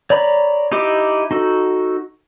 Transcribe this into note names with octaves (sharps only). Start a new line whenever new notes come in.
C#5 D5 A#5 B5
D#4 E4 G4 D6
D#4 F#4 A4